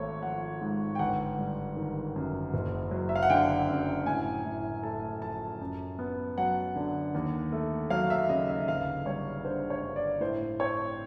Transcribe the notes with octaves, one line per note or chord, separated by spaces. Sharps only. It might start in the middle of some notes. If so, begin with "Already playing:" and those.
Already playing: G#1 A3 C#5
F3 F#5
G#2
G5
G1 F#5
G3
D#3
F#2
F#1
F#3
E5
F5
F#5
D3 G5
F#2
A2 G#5
A2
A3 A5
F3 A5
F#2
B3
F#3 F#5
D3
D#2
A3
F#3 F5
E5
C#3 D#5
E5
G1 F5
G3 C#5
D3 C5
C#5
G2
D5
A2 C5
C4 C#5